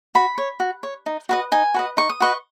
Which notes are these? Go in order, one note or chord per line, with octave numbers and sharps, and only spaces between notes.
F#4 B5
C#5
F#4
C#5
D#4
F#4 B4 D#5
D#4 G#5
F#4 B4 D#5
D#4 C#6
D#6
F#4 B4 D#5 C#6